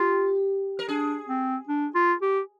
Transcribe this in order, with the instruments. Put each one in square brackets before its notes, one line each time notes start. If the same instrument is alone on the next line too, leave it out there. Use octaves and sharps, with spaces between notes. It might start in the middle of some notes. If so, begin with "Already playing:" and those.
Already playing: [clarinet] F4 [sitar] G4
[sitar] A#4
[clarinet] D4 [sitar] G#4
[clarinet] C4
D4
F4
G4